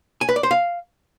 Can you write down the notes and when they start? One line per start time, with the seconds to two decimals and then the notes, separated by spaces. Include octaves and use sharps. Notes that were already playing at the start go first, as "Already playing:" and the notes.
0.21 G#5
0.29 B4
0.36 D5
0.43 C5
0.51 F5